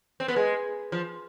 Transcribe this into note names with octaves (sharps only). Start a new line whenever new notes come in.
C4
B3
G#3
F3